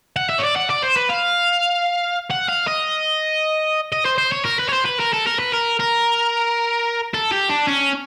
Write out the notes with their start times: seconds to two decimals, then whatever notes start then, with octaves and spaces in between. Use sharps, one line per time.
0.16 F#5
0.29 E5
0.39 C#5
0.43 D5
0.56 F#5
0.70 D5
0.83 C5
0.97 B4
1.10 F5
2.31 F#5
2.48 F5
2.67 D#5
3.92 D#5
4.05 C5
4.18 C5
4.32 C#5
4.45 A#4
4.59 B4
4.69 C#5
4.73 C5
4.85 B4
5.00 A#4
5.13 A4
5.26 A#4
5.39 B4
5.53 A#4
5.79 A#4
7.14 A4
7.32 G4
7.49 D4
7.67 C#4